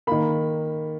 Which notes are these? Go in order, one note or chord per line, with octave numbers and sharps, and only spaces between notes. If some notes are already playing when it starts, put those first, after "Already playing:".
D#3 A#3 B5